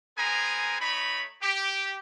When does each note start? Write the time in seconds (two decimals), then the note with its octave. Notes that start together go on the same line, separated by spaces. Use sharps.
0.18 B3 C4 G#4 A#4 G#5 A#5
0.80 A3 D#4 C#5 B5
1.42 G4